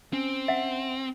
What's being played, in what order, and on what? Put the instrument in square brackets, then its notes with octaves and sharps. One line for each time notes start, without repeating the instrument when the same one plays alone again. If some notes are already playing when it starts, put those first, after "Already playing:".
[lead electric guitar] C4 [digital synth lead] C#4
[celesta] E5 F#5